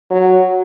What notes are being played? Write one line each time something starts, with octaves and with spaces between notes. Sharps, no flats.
F#3